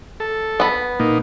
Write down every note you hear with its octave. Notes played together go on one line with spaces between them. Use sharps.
A4
B3 B5
A#2 A#3 D#4